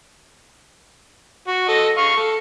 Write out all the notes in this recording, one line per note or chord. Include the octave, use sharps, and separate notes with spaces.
F#4
A4 D#5
F5 C#6
A4